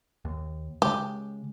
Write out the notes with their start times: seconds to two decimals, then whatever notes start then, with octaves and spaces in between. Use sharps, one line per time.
0.25 D#2
0.82 C#3 G#3 G4